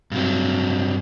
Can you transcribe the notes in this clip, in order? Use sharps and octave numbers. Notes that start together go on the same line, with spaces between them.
G2 C3 F#3